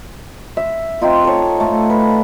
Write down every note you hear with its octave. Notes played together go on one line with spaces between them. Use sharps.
E5
C4 D#4 F4
A4 C#5
A3
B4